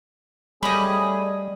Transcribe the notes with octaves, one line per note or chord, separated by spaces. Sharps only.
G3 A3 C#4 G#4 D#5 B5